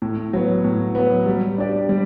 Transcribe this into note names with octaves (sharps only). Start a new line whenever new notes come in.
A2
F#3 B3
A2
F#3 B3
G3
D4 G4 D5
G3